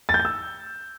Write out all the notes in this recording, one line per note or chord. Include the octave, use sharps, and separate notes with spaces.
A6
G6
A6
E6